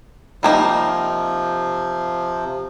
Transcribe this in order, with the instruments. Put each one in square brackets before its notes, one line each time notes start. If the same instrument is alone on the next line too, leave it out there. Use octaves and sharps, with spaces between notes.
[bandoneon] C3 F3 [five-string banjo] G3 A#3 D#4